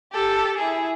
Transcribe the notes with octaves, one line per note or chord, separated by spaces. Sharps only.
G4 A4
E4 G#4